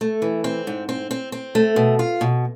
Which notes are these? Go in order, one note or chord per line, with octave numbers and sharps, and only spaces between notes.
A3
E3
C4
G#2
C4
C4
C4
A3
B2
F4
B2